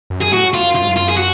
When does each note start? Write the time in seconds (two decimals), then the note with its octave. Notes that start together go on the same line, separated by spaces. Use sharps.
0.10 F#2
0.21 G#4
0.32 A2 F#4
0.54 F4
0.61 F#2
0.75 F4
0.83 G#2
0.89 F#2
0.96 F4
1.09 G#4
1.17 F#4